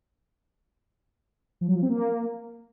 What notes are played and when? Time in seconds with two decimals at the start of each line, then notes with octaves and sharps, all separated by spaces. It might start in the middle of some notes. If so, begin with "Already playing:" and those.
1.61 F3
1.68 F#3
1.75 F3
1.82 C4
1.89 A#3